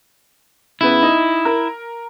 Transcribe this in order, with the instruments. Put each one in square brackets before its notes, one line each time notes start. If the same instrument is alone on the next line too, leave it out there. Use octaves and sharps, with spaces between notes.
[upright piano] C#3 B3 [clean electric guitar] E4
[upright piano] D#4
A#4